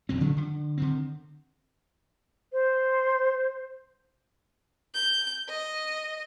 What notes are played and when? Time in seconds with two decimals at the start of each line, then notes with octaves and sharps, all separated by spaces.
0.09 A#1 F2 C3 C4
0.20 C#3 F3 G3 C#4
0.36 D3
0.78 D3 D#3 C4
2.53 C5
4.94 G6
5.49 D#5